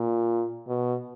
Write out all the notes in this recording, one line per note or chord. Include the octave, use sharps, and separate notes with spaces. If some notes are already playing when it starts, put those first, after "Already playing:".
Already playing: A#2
B2